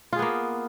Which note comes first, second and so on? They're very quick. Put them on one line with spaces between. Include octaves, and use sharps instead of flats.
F4 G#4 B3 A#3